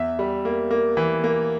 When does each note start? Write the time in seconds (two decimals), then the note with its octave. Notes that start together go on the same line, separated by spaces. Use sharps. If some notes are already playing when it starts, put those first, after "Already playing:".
Already playing: E2 E5
0.19 G3
0.45 A#3
0.71 A#3
0.97 E3
1.24 A#3